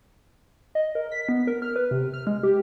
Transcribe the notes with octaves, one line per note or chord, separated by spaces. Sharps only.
D#5
A#4
B6
B3
A#4
F6
B4
C3
F6
G#3
G4